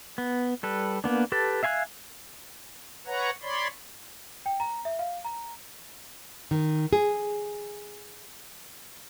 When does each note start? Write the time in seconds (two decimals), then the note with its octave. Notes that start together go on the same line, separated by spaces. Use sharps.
0.18 B3
0.63 G3 A4 B4
1.04 A#3 B3 D4
1.32 G4 A4 B4 A5
1.63 E5 F5 G#5 B5 F#6
3.06 B4 C#5 F#5 A#5
3.42 C#5 D5 B5 C6
4.46 G5
4.60 A#5
4.85 E5
4.99 F5
5.25 A#5
6.51 D#3
6.93 G#4